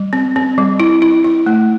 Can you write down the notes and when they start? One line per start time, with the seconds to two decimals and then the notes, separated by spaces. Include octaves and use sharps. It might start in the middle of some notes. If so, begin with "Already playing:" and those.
Already playing: G3
0.13 C4
0.36 C4
0.58 G3
0.80 E4
1.02 E4
1.24 E4
1.46 A3